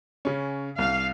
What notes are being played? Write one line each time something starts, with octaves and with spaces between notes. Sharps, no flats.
C#3 C#4
C2 F5